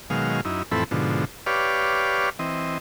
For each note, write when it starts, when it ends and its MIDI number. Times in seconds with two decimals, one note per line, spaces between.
0.10 0.41 47
0.10 0.41 51
0.10 0.41 54
0.10 0.41 56
0.10 0.41 77
0.45 0.63 42
0.45 0.63 63
0.45 0.63 64
0.72 0.84 41
0.72 0.84 45
0.72 0.84 52
0.72 0.84 60
0.72 0.84 69
0.72 0.84 83
0.91 1.25 44
0.91 1.25 47
0.91 1.25 50
0.91 1.25 53
1.46 2.30 67
1.46 2.30 71
1.46 2.30 73
1.46 2.30 74
1.46 2.30 77
2.39 2.78 52
2.39 2.78 60
2.39 2.78 75